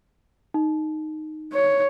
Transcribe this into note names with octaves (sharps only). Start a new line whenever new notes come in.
D#4
C#5